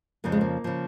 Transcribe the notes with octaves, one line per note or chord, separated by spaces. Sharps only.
F2 C#3 F3 A#3
G#3
A#3
C#3 F3